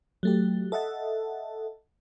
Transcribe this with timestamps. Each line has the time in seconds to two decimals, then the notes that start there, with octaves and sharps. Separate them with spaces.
0.23 F#3 A3 G4
0.72 A4 D#5 E5 F#5 A5